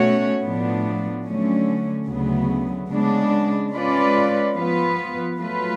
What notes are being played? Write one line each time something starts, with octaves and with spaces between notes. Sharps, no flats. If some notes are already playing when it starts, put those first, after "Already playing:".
Already playing: B2 A3 C#4 F#4 C#5
A2 F3 B3 D4
D3 F#3 A3 C#4
D2 C#3 F#3 B3
C#3 G#3 B3 D4
G#3 C#4 F4 B4 D5
F3 B3 F4 B4
F#3 A3 F4 B4